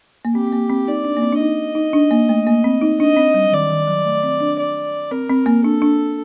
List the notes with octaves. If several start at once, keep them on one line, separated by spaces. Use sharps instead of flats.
A#3
C4 G4
C4
A#3
C4
D#4 D5
D4
A#3
C4
D4
D#4 D#5
D#4
D4
A#3
A3
A#3
C4
D#4
D4 D#5
C4
G3
F#3
D#3 D5
D#3
F#3
A3
C4
D4
D5
C4 A#4
C4
A#3
D4 A4
D4